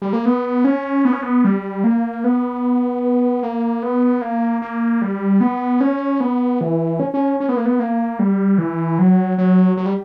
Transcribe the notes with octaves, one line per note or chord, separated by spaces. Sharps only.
G3
A#3
B3
C#4
B3
C#4
B3
G3
A#3
B3
A#3
B3
A#3
A#3
G3
B3
C#4
B3
E3
C#4
C#4
C#4
B3
A#3
B3
A#3
G3
E3
F#3
F#3
F#3
G3